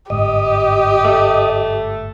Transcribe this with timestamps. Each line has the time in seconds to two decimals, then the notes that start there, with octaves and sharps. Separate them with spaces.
0.10 G1 G#2 G4 D#5
1.05 A3